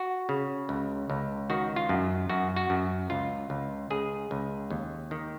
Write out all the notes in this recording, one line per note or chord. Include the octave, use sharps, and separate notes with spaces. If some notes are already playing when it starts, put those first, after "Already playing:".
Already playing: F#4
C#3
C#2
C#2
D#3 F#4
F4
F#2
F#2 F#4
F#4
F#2
C#2 F4
C#2
C#2 G#4
C#2
D#2
D#3